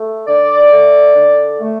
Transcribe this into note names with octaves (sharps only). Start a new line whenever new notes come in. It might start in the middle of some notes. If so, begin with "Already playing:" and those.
Already playing: A3
D3 D5
A3
D3
A3